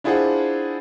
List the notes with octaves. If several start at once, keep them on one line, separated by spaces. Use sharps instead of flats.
D4 E4 F4 G#4 C5 F#5